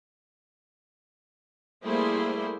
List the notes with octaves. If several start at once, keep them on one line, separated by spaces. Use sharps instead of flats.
G3 A3 A#3 E4 G#4 C5